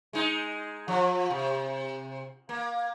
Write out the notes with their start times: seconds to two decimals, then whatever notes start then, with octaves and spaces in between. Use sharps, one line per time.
0.13 G#3 D#4
0.88 F3
1.30 C3
2.49 A#3